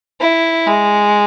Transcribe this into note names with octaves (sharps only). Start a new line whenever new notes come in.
E4
G#3